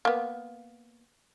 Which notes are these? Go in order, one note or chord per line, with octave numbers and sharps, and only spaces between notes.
A#3 B3